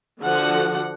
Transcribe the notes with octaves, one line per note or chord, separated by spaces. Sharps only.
D3 F3 F#4 F#5